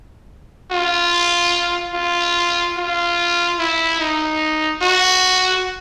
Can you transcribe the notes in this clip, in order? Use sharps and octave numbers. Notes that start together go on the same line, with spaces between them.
F4
F4
F4
E4
D#4
F#4